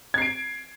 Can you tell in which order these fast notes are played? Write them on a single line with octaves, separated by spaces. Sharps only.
G#6 C7 D7